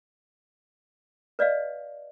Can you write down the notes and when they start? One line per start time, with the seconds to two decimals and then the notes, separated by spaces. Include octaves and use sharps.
1.39 B4 D5 D#5 F5